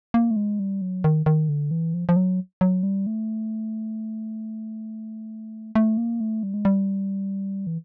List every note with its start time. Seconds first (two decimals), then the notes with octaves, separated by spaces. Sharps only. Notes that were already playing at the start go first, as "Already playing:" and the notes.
0.14 A#3
0.31 A3
0.36 G#3
0.59 G3
0.82 F#3
1.04 D#3
1.26 D#3
1.49 D3
1.71 E3
1.94 F3
2.09 F3
2.16 F#3
2.61 F#3
2.83 G3
3.07 A3
5.75 A3
5.98 A#3
6.21 A3
6.43 G3
6.54 G#3
6.65 G3
7.67 E3